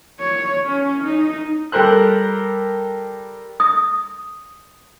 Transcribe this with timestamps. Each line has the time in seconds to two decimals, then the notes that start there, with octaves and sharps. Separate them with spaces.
0.20 C#5
0.66 C#4
1.03 D#4
1.72 G3 A4 A#4 C5 F#6
3.60 D#6